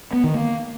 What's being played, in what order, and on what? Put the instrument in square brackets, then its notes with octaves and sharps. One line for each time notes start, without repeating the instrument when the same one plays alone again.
[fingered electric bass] B3
D#3
A#3